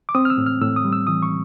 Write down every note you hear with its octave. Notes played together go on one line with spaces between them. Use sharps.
D6
C4 D#6
F6
E6
A2
F6
A2 E6
D#6
G3
E6
E3 D#6
C#6